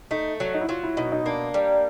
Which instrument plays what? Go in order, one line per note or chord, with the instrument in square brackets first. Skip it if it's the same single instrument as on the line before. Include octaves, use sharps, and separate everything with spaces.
[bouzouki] A3 [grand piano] D#4
[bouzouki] F#3
[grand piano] D#4
E4
[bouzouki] F#3 [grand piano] F4
[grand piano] E4
[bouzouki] B2 [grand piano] D#4
[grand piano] D#4
[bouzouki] A#3 [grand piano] D4
[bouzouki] G3